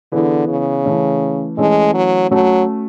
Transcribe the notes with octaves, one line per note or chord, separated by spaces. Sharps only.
D3 E3 B3 E4 G#4 B4
C#3
E3 A3 C#4
E3 G#3 A3 C#4
F#3
F#3 A3 C#4 F#4